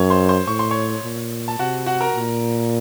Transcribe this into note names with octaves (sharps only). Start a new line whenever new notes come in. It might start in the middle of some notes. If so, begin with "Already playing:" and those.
Already playing: F#2 C#5 C#6
C5 C6
C5 C6
A2 C#6
C6
C#5 C#6
A#2
A5
C3 F#4 F#5
F#4 F#5
A#4 A#5
A#2